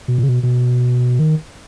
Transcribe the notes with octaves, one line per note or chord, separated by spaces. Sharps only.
B2
A#2
C#3
B2
B2
D#3